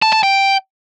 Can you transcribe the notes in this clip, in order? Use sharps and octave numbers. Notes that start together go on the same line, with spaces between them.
A5
A5
G5